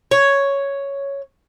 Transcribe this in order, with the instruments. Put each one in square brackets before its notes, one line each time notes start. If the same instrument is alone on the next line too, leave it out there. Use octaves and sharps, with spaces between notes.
[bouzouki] C#5